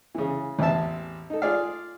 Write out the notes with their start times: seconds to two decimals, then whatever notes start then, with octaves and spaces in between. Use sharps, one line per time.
0.15 C#3 E3
0.59 A1 E2 C4 E5 A5
1.30 D#4 A4
1.42 F4 G#4 D5 F5